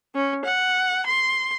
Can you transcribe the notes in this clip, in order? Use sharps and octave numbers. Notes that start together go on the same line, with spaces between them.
C#4
F#5
C6